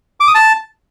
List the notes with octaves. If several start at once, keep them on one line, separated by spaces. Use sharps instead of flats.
D6
D#6
A5